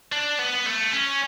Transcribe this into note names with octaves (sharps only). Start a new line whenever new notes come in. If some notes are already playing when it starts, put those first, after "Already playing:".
D4
B3
A3
C#4